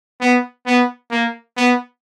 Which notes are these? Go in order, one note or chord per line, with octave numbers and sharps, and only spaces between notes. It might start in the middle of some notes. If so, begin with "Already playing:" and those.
B3
B3
A#3
B3